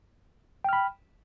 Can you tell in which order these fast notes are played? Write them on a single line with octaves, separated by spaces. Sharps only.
G5 F6 B5